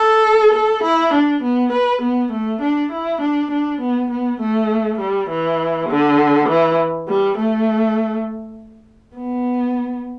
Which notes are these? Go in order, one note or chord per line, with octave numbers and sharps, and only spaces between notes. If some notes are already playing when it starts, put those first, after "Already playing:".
Already playing: A4
A4
E4
D4
B3
B4
B3
A3
D4
E4
D4
D4
B3
B3
A3
G3
E3
D3
E3
G3
A3
B3